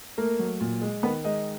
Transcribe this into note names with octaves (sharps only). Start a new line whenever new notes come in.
A3 A#3 A#4
F#3
A#2
G#3
D#3 B3 B4
G#3 D#4 D#5